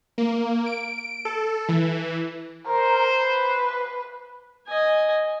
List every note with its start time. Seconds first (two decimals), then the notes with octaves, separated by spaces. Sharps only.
0.18 A#3
0.66 D7
1.25 A4
1.69 E3
2.67 A#4 C5
3.22 B4
4.67 D#5 G#5